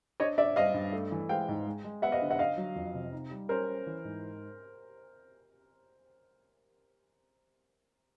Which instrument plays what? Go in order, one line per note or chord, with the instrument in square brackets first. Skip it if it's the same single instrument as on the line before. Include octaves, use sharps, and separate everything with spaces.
[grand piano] D4 [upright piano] C#5 D#5
[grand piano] D4 [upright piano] D5 E5
[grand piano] G2 [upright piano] D#5 F5
[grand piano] G2
A3
E3
[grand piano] G#3 [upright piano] F5 G5
[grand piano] G#2
G#3
G#3
[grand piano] B3 [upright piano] E5 F#5
[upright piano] D#5 F5
[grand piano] D3
[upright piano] E5 F#5
[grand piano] D3 [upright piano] D#5 F5
[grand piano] F#3
F2
C3
D#4
G3
[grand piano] C#4 [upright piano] A#4 C5
[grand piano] C#4
E3
G#2